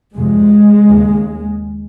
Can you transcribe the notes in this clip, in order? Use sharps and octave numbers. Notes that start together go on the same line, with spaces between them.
F2 C3 G#3
D#2 C#3